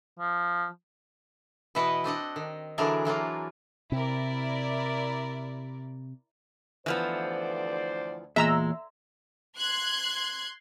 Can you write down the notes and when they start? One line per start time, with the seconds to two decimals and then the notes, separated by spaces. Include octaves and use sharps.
0.19 F3
1.75 B2 E3 E4 B4 D#5 F#5
2.04 C4 D4 D#5 F#5
2.36 D#3
2.78 D3 E3 F#3 D4 G#4 A#4
3.05 E3 F#3 A#3 F4
3.92 C3 E4 A#4 D5
6.86 D2 E3 F3 B3 C5 D5
8.36 E2 A#2 G#3 E5 A#5 E6
9.58 C6 F#6 G#6